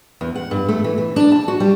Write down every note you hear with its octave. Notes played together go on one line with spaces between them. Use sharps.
E2
F#5
G2
A3
E3
E3
D4
A5
F#4
G3